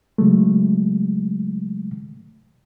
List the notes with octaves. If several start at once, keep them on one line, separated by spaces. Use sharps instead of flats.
C#3 F#3 G#3 A3